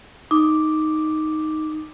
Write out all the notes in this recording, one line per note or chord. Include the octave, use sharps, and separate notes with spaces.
D#4 D6